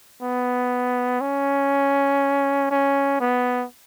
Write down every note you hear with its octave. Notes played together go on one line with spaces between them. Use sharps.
B3
C#4
C#4
B3